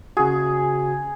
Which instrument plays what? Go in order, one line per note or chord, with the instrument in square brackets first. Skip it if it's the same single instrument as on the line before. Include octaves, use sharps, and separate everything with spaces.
[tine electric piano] C#3 F#4 [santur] G#4